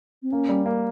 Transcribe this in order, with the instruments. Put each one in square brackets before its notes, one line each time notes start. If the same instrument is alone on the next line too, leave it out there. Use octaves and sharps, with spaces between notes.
[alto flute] C4
[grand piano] A#3 [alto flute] C#4
[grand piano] G3
A#3